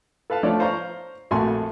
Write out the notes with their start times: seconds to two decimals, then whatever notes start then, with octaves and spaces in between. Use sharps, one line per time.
0.30 A4 B4 F5 A5
0.43 F3 A3 D4 C#5 D5
0.60 C5 F5 A#5 C#6
1.31 A#1 F2 A3 F#4 G#5 C6